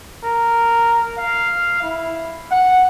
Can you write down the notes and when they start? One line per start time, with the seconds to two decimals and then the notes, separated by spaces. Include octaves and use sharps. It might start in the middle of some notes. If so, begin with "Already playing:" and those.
0.24 A#4
1.17 F5
1.82 E4
2.51 F#5